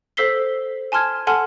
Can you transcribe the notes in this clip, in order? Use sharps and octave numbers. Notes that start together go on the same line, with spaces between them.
A4 C5 E6 B6 C7 G7
G#5 A5 C6 F6 G#6
A4 F#5 G#5 A5 C6 F6